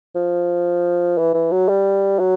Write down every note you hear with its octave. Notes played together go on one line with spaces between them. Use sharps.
F3
E3
E3
F#3
G3
F#3